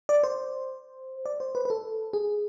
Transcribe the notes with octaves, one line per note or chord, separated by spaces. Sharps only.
D5
C5
D5
C5
B4
B4
A4
G#4